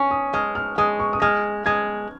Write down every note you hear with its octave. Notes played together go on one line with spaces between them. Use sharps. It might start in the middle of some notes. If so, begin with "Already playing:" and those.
Already playing: C#4 C#6
D#6
G#3 F6
F6
G#3 D#6
C#6
D#6
G#3 F6
G#3 G#6